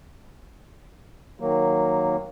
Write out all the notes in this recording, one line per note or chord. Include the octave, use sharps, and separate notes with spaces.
D#3 F#3 A#3